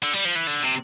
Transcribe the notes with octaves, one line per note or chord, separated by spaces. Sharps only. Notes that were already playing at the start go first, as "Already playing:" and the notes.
D3
G3
F3
E3
D3
C3